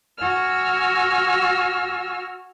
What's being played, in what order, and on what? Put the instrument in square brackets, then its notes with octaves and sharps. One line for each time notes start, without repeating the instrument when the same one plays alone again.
[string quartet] F#4 G#5 E6 F6